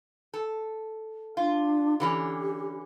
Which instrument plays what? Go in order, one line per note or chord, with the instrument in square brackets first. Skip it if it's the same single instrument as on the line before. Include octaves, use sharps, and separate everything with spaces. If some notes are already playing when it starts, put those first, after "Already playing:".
[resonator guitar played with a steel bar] A4
[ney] D4 [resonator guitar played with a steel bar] F4
[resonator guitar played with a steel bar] D3 E3 C#4 [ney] G4